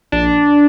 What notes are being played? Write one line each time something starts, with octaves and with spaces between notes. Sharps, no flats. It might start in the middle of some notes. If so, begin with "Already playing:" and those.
A#1 D4